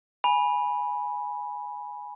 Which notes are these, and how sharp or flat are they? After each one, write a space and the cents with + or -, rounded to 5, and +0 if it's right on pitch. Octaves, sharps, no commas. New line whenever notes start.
G#5 +0 B5 -10